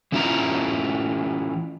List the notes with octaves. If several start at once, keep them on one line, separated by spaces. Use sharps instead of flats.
E3 C#4 E4 F4 A#5